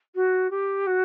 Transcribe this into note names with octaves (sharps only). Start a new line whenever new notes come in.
F#4
G4
F#4